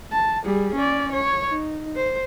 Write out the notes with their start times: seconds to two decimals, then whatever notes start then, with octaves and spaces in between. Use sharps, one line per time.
0.12 A5
0.44 G3 G#4
0.75 C#4 D5
1.13 C#5
1.49 D#4
1.96 C5